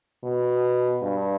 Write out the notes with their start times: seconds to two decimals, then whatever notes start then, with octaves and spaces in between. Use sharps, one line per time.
0.24 B2
1.03 G2